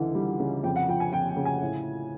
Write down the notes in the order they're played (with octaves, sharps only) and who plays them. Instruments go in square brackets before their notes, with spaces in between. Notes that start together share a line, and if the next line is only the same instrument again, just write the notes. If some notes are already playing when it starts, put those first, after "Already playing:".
Already playing: [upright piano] C#2 D3 E3
G3
C#3
F2 G5
F#5
F3 G5
G#5
F2 G5
G5
C#3
G#5
A2